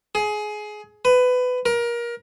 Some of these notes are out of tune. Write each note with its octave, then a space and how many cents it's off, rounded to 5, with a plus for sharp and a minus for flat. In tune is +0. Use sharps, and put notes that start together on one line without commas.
G#4 +20
B4 +20
A#4 +25